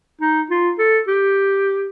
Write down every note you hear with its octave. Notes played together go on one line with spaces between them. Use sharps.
D#4
F4
A4
G4